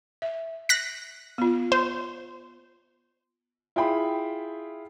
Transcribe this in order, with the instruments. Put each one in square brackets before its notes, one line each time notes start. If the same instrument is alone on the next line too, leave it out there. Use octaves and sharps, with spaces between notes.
[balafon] E5
[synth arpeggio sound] F#6 A#6 B6
[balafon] B3 F4
[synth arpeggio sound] C5
[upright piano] E4 F4 G#4 G5 B5